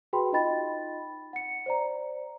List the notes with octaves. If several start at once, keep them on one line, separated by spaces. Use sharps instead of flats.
F#4 G#4 B4 G5 B5 C6
D#4 F4 D#5 G5 B5 A6
F#5 C#7
C5 D5 A#5